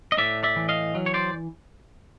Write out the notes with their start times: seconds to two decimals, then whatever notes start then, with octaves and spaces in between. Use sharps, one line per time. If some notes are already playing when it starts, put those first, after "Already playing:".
0.12 D#5
0.18 A2 D5 E5
0.43 D5 E5
0.56 E3
0.69 D#5 F5
0.95 F#3
1.06 C#5
1.14 C5 D5